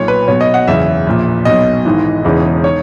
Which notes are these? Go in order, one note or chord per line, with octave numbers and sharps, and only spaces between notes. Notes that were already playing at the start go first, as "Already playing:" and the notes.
Already playing: B1 A#2 C#5
B4
B1 B2 C#5
D#5
F#5
F#1 E2 C#3 E3 E5
A#1 A#2
B1 B2 D#5
G#1 G#2 E3
E1 E2 C#3 E3
D#3 C#5